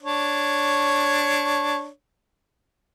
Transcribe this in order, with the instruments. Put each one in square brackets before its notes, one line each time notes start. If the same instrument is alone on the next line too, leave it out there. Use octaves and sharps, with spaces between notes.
[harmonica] D4 C#5